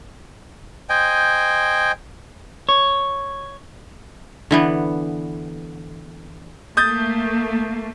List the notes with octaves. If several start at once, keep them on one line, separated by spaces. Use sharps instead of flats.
C5 D#5 G5 G#5
C#5
D3 E3 B3
A3 A#3 D#6 G6 A6